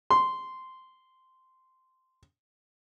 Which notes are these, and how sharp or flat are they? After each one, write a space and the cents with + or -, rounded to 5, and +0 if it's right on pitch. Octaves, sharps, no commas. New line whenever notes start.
C6 -10